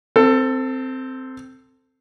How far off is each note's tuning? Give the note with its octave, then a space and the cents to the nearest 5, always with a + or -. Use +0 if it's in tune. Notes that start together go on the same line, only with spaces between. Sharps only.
C4 -5 A4 +20